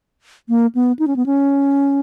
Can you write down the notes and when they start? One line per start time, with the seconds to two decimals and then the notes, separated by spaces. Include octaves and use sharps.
0.49 A#3
0.75 B3
0.99 D#4
1.07 C#4
1.16 B3
1.26 C#4